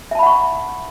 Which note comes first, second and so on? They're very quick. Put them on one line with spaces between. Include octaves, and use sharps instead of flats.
E5 A5 B5 F#5 C#6